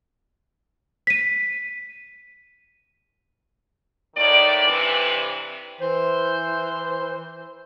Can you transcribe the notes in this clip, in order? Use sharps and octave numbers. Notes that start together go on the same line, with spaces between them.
B6 D#7
D#2 A2 D#3 D5
G2 C3 E3
E3 C5